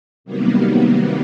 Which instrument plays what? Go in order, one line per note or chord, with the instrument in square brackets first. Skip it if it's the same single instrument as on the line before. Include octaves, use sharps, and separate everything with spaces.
[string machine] C3 D#3 F#3 G3 A#3 B3